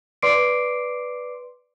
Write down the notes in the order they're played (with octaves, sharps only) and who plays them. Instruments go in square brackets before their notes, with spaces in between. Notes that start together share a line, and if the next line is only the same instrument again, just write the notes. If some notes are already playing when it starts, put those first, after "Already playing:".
[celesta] B4 D5 C6 D6 C7 D7